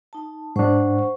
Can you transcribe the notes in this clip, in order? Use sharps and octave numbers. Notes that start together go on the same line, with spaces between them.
D#4 A5
G#2 D4 C5 F#5 C#6